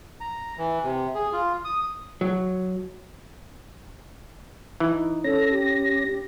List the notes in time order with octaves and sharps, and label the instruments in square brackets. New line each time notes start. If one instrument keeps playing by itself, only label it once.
[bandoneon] A#5
E3
C3
G#4
F4
D#6
[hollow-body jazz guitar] F#3
[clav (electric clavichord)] E3 [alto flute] D#4
[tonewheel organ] C#4 A#6 [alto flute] A4
[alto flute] G4